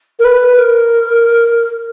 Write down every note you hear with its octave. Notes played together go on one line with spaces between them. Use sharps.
A#4
B4
A#4